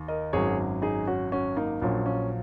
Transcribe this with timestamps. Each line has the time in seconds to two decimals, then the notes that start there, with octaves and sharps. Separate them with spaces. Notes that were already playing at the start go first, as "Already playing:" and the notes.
Already playing: D#2
0.08 A#4 D#5
0.33 G#1 F#2 F#3 G#4 C#5
0.82 D#4 G#4
1.07 C#4 F#4
1.32 C#4 F#4
1.57 A#3 D#4
1.82 A#1 A#2 F#3 C#4
2.06 C#4